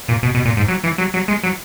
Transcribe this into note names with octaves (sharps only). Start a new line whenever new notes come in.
A#2
B2
B2
A#2
G#2
F#3
E3
F#3
F#3
G#3
F#3